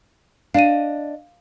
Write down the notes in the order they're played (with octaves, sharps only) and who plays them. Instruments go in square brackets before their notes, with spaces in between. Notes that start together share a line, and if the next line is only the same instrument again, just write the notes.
[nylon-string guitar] D4 D#5 [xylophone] F5 D#7